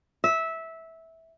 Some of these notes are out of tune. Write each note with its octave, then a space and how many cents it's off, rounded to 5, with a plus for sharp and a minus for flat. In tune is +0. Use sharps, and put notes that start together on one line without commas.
E5 -15